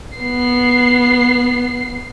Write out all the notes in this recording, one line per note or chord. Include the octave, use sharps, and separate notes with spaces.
B3 C7